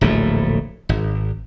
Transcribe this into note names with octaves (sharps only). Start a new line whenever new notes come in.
D1 A#1 A2 A3
G#1